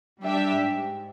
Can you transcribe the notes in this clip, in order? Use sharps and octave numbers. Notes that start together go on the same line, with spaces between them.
G3 D4 G4 E5
G#2